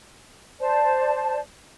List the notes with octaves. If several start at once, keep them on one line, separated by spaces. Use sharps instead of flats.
C5 D5 A5